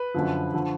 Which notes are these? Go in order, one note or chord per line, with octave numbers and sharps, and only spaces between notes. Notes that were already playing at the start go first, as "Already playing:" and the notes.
Already playing: B4
F#2 D3 F3
D3 F3